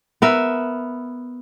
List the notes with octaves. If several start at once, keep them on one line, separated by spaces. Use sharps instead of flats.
B3 A#4 E5